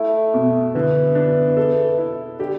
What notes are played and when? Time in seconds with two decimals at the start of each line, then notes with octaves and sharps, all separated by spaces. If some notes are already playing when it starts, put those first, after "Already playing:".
Already playing: A3 E4
0.34 B2
0.75 D3 E3
1.15 D4
1.57 A4
1.98 E4
2.39 D3 G4